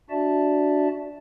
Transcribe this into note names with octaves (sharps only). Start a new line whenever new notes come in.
D4 F#4 D5 E5 A5